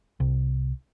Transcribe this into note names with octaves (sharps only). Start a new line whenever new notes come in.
C2